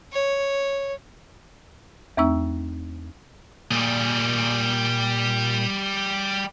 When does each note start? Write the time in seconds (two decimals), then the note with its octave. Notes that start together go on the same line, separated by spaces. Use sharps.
0.12 C#5
2.17 E2 A3 C4 D#4 E6
3.71 A#2 G3 G#4